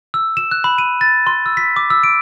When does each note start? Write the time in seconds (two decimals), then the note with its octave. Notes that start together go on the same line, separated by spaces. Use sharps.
0.14 E6
0.37 E7
0.51 F#6
0.64 B5
0.78 D#7
1.01 A6
1.27 C6
1.46 E6
1.57 B6
1.76 D6
1.90 E6
2.04 D7